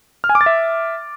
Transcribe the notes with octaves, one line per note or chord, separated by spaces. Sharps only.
F6
G#5
D6
A6
E5